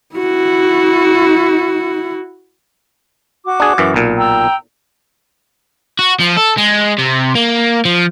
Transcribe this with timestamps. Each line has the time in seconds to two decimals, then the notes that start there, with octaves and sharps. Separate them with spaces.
0.15 E4 F#4
3.44 F#4 D6
3.60 D4 G#4
3.78 F#2 E3
3.94 B1 A#2
4.18 G5 A#5 E6
5.99 F#4
6.20 F3
6.37 A4
6.57 G#3
6.98 C3
7.35 A#3
7.85 F3